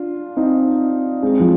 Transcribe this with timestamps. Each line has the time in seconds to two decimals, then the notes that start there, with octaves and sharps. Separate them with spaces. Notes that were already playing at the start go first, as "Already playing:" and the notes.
Already playing: D4 F4
0.37 C4 D#4
1.22 G#3 C4
1.40 F3